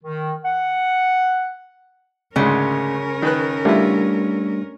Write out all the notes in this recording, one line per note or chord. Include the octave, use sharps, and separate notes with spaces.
D#3
F#5
D2 G#2 C#3 C#4 A#4
D#3 B4 F#6
G3 A3 D4 E4 F4